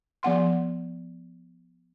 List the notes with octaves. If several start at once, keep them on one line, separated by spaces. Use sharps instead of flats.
F3 B3 F#5 C6